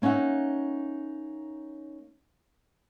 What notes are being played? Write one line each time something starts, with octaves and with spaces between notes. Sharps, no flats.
A#3 C#4 D#4 E5 F#5